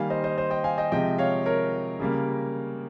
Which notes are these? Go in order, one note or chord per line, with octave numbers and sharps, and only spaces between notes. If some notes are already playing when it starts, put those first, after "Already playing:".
Already playing: D#3 G3 A#3 F5 G#5
C5 D#5
C5 D#5
C5 D#5
D#5 G5
F5 G#5
D#5 G5
C3 F3 G#3 D#5 G5
C#5 F5
A#4 C#5
C#3 G3 A#3